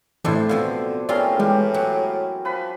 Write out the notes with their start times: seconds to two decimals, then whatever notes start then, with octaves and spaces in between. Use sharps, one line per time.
0.24 A2 E3 F3 A3 C4 D4 E4 C5
0.49 B2 D3 F3 C4 F5
1.09 A2 C4 C#4 F4 G#4 A#4 D5 C6
1.40 E3 G#3 G4
1.74 F#3
2.45 F3 B4 B5